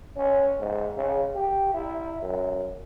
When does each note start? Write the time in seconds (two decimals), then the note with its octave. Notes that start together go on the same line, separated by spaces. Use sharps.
0.17 C#4
0.60 G#2
0.96 C#3
1.35 G4
1.74 E4
2.22 F#2